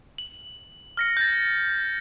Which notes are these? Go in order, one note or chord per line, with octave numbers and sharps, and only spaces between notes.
F#7
F6 A#6 C#7
G6 A6